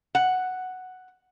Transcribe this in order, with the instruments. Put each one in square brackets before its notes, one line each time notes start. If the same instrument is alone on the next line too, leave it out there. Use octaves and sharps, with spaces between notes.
[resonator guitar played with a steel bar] F#5